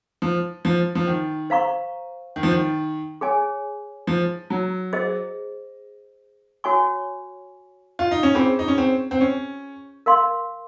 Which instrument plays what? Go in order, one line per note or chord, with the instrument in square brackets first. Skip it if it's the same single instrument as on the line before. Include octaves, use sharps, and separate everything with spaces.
[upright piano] F3
F3
F3
D#3
[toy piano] C5 F5 A#5 C#6
[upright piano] D#3
F3
D#3
[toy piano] G#4 C#5 G#5
[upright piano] F3
F#3
[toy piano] G#4 C5 D#5
F#4 C#5 G#5 C#6
[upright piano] F4
D#4
C#4
[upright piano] C4 [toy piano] F4 G#4 C5
[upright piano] D#4
C#4
C4
C4
C#4
[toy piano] A#4 F5 C6